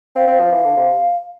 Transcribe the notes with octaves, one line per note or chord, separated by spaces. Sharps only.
C4 F5
C4
F3
E3
D3
C3